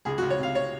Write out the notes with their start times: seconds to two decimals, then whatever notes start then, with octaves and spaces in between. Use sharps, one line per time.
0.05 C#2 G#4
0.18 C#2 F#4
0.30 C#5
0.38 C3 F5
0.55 C#5